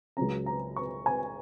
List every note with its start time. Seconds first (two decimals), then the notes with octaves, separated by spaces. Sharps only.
0.17 C#2 C#3 F#3 C#4 A#5
0.46 A#5
0.76 C#6
1.06 G#5